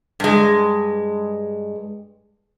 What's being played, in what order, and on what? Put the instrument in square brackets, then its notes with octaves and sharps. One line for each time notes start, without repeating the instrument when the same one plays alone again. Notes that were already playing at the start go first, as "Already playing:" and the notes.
[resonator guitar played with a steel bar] G2 G#3